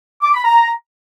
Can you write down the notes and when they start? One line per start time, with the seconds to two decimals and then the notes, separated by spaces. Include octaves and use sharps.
0.22 D6
0.34 B5
0.45 A#5